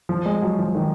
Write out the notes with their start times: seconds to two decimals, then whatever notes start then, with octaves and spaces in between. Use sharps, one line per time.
0.09 F3
0.26 G#3
0.42 F#3
0.59 F3
0.75 D#3